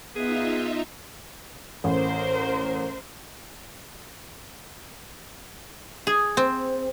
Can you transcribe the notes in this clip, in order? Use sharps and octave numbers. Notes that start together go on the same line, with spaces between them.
B3 D#4 F4 G#4 E5
A1 A#4 C5
G#4
C4